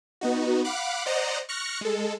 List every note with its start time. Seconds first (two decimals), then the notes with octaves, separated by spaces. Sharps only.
0.21 B3 D#4 F#4
0.64 F5 F#5 B5 D6 F#6
1.06 C5 D5 D#5 F#5 A#5
1.49 C#6 F6 F#6 A#6 C#7
1.81 G#3 A4